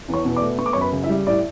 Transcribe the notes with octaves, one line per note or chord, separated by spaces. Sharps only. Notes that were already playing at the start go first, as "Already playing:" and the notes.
E2
C#5 C#6
B2
D5 D6
A3
B3 C#6
D6
F#2 C#5 C#6
B4 B5
C#3
E4 E5
G3
A2 D5